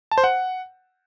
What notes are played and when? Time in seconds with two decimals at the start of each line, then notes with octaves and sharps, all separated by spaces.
0.11 A5
0.18 C5
0.24 F#5